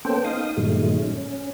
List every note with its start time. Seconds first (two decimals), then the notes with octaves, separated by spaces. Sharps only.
0.05 A#3 B3 C#4 A4 C5 G5
0.24 D#4 F5 D#6
0.57 G2 A#2 D#3 F#3 G#3 A3
1.02 C#4